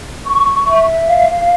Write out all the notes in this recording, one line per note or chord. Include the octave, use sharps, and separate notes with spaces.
C#6
E5
F5